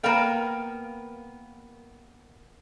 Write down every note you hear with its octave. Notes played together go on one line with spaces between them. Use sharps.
A#3 B3 A#4 B4 F5 G5